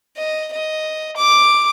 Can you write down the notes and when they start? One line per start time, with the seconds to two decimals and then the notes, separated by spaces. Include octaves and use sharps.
0.17 D#5
0.53 D#5
1.17 D6